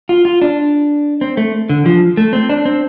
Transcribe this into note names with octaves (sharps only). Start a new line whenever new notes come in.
F4
F4
D4
C4
A3
D3
F3
A3
C4
D4
C4